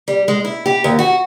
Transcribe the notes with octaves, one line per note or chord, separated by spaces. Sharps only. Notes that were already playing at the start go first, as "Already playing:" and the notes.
G3
G#3
E4
G4
D#2
F#4